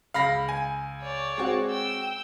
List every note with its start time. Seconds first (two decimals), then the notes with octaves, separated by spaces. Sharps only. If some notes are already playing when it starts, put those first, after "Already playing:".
0.14 C#2 F5 B5 A#6
0.49 G#5
1.01 C#5 D5
1.38 G#3 C4 F#4
1.70 G5 E6